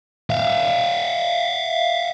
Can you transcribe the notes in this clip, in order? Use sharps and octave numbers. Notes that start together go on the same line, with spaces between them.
E5 F5